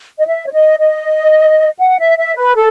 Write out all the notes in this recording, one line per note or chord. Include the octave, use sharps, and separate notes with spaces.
D#5
E5
C#5
D#5
D#5
F#5
E5
E5
B4
A4